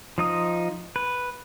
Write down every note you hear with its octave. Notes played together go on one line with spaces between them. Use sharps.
F3 D#4 D#6
B4